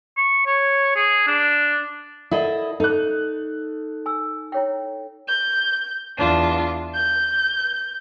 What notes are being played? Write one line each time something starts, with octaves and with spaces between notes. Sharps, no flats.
C#6
C#5
G#4
D4
E4 A4 A#4 D5 D#5 F#5
D#4 A4 F#6
G#5 E6
E4 C#5 G5
G6
E2 D4 F4
G6